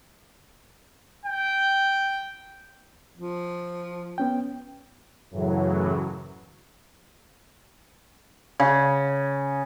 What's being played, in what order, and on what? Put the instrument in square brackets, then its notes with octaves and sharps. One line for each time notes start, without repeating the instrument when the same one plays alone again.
[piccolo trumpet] G5
[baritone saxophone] F3
[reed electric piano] B3 C#4 G5
[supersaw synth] F#2 A2 C#3 E3 F#3
[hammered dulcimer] C#3